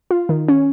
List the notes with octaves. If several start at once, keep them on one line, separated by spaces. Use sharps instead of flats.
F4
D#3
C#4